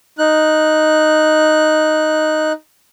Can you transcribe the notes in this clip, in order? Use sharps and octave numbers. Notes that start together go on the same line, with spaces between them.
D#4 F#6